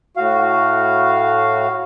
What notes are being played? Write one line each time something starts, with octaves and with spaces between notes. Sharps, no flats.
A2 F#4 F5